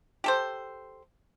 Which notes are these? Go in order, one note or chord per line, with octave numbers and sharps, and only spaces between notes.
G4 A4 C5